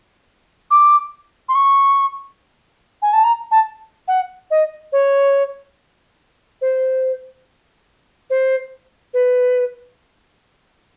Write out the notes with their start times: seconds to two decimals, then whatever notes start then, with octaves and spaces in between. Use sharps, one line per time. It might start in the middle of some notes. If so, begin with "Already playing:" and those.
0.71 D6
1.49 C6
1.55 C#6
3.02 G#5
3.13 A5
3.24 A#5
3.51 A5
4.08 F#5
4.51 D#5
4.92 C#5
6.61 C5
8.30 C5
9.14 B4